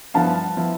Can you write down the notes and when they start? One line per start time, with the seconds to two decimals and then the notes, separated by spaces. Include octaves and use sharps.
0.14 G2 F3 B3 E4 F5 A5
0.57 F3 B3 E4